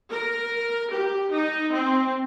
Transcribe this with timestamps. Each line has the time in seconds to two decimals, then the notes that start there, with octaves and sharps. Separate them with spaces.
0.10 A#4
0.92 G4
1.32 D#4
1.73 C4